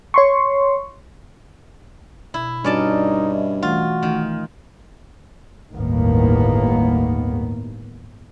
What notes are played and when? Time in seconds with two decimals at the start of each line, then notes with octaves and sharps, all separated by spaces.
0.14 C#5 C6 C#6
2.34 B2 E4
2.64 G2 C#4 D#4 F#4 D5 A5 F6
3.31 D#5 E5
3.63 E3 A3 F4 F#4
4.03 D#3 A3
5.72 G1 D#2 A2 D#3 A#3 B3